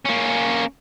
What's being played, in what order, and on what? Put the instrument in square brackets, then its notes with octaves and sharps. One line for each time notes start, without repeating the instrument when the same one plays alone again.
[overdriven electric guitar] A#3 C#4